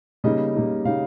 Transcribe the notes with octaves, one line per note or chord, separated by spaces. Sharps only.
C#3 G3 A#3 D#4 D#5
C#3 G3 A#3 D#4
C#3 G3 A#3 D#4 F5